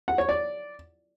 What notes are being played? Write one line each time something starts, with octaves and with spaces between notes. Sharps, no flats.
F#5
C#5
D5